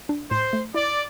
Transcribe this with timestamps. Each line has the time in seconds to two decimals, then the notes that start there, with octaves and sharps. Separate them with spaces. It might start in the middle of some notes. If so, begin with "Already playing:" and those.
0.09 D4
0.31 A2 C5
0.53 A3
0.74 E4 D5